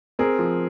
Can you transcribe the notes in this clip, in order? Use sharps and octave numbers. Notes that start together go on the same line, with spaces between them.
C4 G#4 A#4
F3